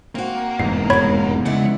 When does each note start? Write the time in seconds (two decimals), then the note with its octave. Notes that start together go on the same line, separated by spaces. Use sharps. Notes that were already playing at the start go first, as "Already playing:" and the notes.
0.15 A#3 C4 F#4
0.59 F1 E2 G#2 C7
0.90 B2 G#3 C#5 B5 G#6
1.46 C#3 F3 G#3 E4 D5 F#5